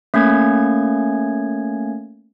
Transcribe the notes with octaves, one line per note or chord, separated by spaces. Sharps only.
A3 A#3 C#4 G#6